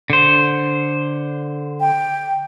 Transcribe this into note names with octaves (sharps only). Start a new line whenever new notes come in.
D3 C5
G5